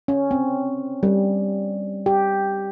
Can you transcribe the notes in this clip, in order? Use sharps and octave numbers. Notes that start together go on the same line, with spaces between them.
C#4
C4
G3
G4